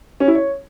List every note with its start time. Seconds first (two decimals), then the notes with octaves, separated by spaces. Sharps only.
0.20 C#4
0.28 E4
0.35 C#5